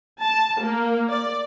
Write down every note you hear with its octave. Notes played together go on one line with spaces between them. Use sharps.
A5
A#3
D5